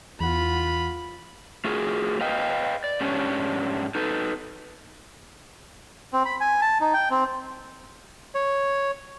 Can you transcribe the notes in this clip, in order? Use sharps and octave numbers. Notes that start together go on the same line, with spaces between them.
E2 F4 F#5 B5
A3 F4 F#4 G#4 A#4
B4 D#5 F5 G5
D5
G#2 C#4 D4 G4 C#5
D#4 A4 B4
C4
B5
G#5
A5
D#4
G5
C4
C#5